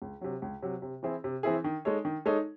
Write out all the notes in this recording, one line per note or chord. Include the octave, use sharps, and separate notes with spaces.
C#2
C3 F#3
C#2
C3 F#3
C3
E3 C4 E4 G#4
C3
E3 C4 E4 G#4
D#3
G#3 D#4 A4 C#5
D#3
G#3 D#4 A4 C#5